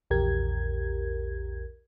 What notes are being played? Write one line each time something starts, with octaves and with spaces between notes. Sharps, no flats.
A#1 E2 G4 A#4 G#6